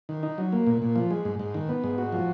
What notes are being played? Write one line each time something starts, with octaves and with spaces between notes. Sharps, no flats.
D#3
D#4
F#3
A#3
A#2
A#2
F3
G#3
G#2
G#2
D#3
B3
G#2
F#4
F3